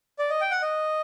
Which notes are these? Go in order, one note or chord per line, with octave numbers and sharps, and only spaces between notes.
D5
D#5
G5
F#5
D#5